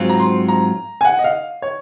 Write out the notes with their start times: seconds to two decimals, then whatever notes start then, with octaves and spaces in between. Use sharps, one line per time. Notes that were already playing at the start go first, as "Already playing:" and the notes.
Already playing: G#2 F#3 C4 F4
0.09 A#5
0.20 C6
0.48 A#5
1.01 G#5
1.05 F#5
1.19 D#5
1.24 F5
1.62 C#5